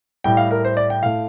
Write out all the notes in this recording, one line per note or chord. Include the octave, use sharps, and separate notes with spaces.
A2 G3 G5
F5
A#4
C5
D5
G5
A2 A3 F5